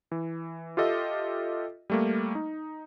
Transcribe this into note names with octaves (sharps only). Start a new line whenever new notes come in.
E3
F4 G4 A4 D#5 E5
G3 A3 A#3
D#4